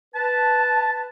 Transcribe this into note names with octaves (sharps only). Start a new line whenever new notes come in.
B4 A5